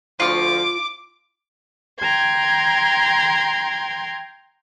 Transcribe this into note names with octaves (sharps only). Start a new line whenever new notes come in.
D2 F3 F4 C#6 D6
G5 A#5 C6 G#6